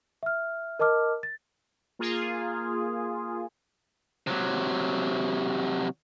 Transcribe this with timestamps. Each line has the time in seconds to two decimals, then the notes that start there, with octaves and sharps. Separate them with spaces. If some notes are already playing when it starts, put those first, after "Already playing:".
0.23 E5 F6
0.79 A#4 D#5 A5 D6 F6
1.23 A6
1.99 A#3 F4 G#4
4.27 C3 F#3